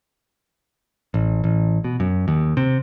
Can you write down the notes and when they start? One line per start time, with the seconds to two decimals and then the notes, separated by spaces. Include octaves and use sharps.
1.14 A1
1.44 A1
1.84 B2
2.00 F#2
2.28 D#2
2.57 C3